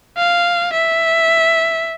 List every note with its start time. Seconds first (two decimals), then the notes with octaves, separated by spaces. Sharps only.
0.18 F5
0.73 E5